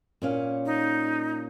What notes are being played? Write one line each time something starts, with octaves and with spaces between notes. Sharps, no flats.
A#2 C#4 F5
D#4